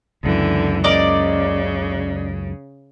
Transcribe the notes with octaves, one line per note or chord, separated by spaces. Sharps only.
C#2 F#2 D3 E3
C#3 A#4 D5 D#5